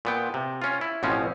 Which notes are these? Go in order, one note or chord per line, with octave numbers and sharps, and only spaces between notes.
A#2 B3 G5
C3
C#4 F4
E4
A1 B2 F3 C4 C#4